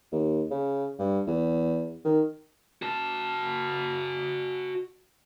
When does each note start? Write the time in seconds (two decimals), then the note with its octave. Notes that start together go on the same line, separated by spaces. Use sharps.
0.12 D#2
0.51 C#3
0.99 G2
1.27 E2
2.05 D#3
2.82 F#4 A5